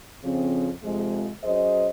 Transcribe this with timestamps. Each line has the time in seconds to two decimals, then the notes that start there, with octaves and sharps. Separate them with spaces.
0.23 F2 C#3 F3 C4
0.83 F2 C3 F3 G#3
1.42 F#3 C#4 G#4 C5 D#5